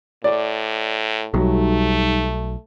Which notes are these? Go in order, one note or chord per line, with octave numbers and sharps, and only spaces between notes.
A2 D5
B1 F#3 G3 A3 D#4 G4